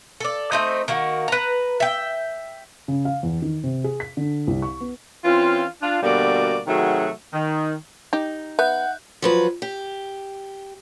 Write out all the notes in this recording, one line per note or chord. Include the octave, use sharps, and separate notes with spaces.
A4 D5
A3 C4 D#4
D#3 A#3 F#4
B4 A#5
E5 G5
C#3
F5
E2
D#3
C3
G#4
B6
D3
C2
C#6
B3
E3 C4 C#4 F4
D4 F4 F5
B2 D3 G3 A#3 F#4 D5
C3 D#3 F#3 A3 F#4 G#4
D#3
D#4 G4
B3 E5 F#5 F#6 G6
F3 F#3 B4
G4